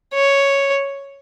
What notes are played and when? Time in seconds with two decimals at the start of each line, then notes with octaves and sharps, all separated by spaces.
0.14 C#5